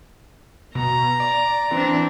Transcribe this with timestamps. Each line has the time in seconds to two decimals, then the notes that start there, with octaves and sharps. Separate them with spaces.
0.75 B2 A#5
1.20 D5
1.71 E3 C4 D4